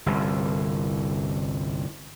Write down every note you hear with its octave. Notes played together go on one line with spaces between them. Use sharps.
G1 C2